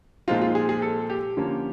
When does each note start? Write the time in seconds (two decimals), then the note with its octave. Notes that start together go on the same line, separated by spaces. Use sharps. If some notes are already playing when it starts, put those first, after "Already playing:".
0.28 A#2 F3 G#3 C4 D#4 F4
0.42 F4
0.55 G#4
0.69 G#4
0.82 A4
1.10 G4
1.37 D3 F3 A#3 C#4